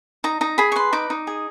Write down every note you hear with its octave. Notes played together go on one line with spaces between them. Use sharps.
D#4 A#5
D#4 A#5
G#4 B5
C#6
B4 C6
D#4 D6
D#4
G#4